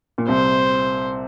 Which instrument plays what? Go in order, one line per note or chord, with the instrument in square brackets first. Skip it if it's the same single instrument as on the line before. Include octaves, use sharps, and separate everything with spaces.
[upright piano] A#2
[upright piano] C2 C3 [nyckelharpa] C5